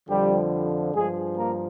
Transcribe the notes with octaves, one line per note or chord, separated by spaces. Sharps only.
F2 D3 F3 G3 G4
G2 F3 G#3 G#4
A#3 A#4